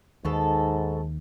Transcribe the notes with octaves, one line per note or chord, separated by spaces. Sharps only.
D#2 G#2 B2 A4